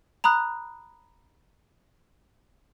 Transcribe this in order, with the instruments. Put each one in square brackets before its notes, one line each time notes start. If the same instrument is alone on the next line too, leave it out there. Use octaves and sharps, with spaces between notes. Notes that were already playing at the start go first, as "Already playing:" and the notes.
[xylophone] A#5 B5 D#6 F#6